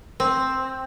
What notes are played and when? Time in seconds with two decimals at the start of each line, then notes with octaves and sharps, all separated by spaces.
0.20 C4